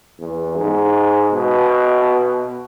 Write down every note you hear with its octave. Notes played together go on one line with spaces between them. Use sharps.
E2
G#2
B2